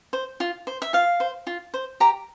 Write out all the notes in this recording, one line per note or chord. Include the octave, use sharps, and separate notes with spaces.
C5
F4
C5
E5
F4 F5
C5
F4
C5
G4 A#5